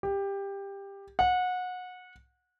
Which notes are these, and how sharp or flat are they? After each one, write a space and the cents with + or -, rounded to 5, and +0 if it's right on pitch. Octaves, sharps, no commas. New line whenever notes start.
G4 +15
F#5 -25